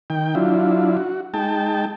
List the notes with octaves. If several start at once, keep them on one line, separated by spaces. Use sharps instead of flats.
D#3 G5
F#3 D4 E4 F4
F#4
G#3 D#4 G5 A5